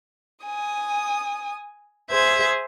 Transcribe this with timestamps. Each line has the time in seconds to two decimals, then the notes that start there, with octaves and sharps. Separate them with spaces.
0.45 G#5 D#6
2.10 G#4 C5 E5 G#6